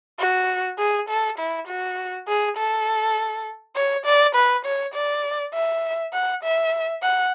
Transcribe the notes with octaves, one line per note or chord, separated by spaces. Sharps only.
F#4
G#4
A4
E4
F#4
G#4
A4
C#5
D5
B4
C#5
D5
E5
F#5
E5
F#5